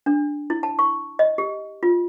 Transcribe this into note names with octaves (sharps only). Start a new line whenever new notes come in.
D4
E4
A5
C#6
D#5
G4
F4